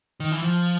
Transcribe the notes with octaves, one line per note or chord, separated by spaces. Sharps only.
D#3
E3
F3